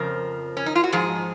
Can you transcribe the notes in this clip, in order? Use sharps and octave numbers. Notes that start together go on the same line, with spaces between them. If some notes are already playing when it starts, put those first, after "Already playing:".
Already playing: F2 C#3 F3 A#4
C#4
D#4
F4
F#4
G#2 F3 G#4